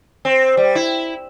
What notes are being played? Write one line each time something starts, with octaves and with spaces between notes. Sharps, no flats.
C4
G3
E4